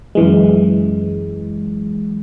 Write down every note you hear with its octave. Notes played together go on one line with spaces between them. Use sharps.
F#2 E3 G#3